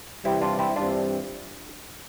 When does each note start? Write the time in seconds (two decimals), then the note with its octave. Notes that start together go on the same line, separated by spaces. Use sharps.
0.25 C3 E3 G3 C4 E4
0.41 D4 F4
0.59 C4 E4
0.76 G2 E3 G3 C4 D4 F4